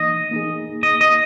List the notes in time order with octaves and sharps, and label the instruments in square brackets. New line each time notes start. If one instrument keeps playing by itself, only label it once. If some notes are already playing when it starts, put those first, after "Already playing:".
Already playing: [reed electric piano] E3 A#3 D#4 [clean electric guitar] D#5
[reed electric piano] A#3 D#4 G#4
[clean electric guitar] D#5
D#5